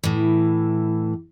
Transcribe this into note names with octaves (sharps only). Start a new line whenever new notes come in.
A2 E3